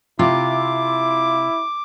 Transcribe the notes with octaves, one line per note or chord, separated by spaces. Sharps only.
C3 E4 F4 D6